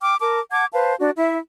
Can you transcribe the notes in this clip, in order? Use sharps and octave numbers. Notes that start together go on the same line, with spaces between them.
G5 D6 F6
A#4 A5 D6
F#5 A5 D6 G#6
B4 C5 F5 A5
D4 F#4
E4 E5